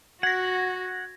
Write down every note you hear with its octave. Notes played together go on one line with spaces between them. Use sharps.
F#4 F#5 G#6 A#6